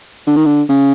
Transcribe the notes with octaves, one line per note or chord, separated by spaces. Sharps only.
D3
D#3
D3
C#3